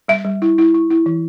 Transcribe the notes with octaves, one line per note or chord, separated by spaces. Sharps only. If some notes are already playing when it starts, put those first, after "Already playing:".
G3 E5
G3
E4
E4
E4
E4
E3